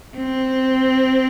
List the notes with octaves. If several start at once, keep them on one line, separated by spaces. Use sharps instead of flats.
C4